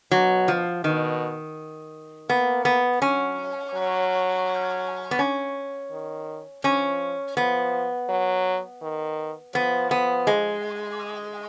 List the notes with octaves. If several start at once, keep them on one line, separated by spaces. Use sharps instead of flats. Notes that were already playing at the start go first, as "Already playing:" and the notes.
B2 F#3
F3
B2 D#3
A#3 B3
B3
F#3 C#4
F#3
B3
C#4
D#3
F3 C#4
F3 B3
F#3
D#3
F3 B3
B3
G#3